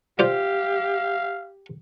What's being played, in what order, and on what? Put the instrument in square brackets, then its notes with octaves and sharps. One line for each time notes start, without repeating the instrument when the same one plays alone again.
[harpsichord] F4 C5 D5 [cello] G4 [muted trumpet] F5